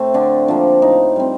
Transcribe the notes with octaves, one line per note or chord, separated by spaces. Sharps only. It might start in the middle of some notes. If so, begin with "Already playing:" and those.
Already playing: A2 A3 C4
D3 D4
F3 A#3 D4
A2 D#4
G3 C4